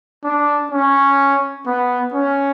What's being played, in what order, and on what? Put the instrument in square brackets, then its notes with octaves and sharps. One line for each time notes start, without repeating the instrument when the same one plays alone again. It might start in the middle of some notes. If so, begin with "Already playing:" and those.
[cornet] D4
C#4
B3
C#4